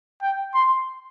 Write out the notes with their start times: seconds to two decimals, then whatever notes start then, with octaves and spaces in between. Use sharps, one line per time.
0.22 G5
0.54 C6